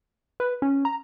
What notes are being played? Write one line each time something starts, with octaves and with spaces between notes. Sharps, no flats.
B4
C#4
A#5